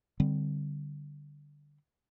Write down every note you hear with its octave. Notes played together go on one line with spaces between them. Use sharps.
D3 G3 C4